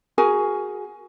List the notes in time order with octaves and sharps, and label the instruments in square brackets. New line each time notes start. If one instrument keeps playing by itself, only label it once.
[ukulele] F#4 G#4 A#4 G#5